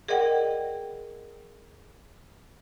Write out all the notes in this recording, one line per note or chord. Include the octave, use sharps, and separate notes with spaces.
G#4 A#4 D5 D#5 F#5 G5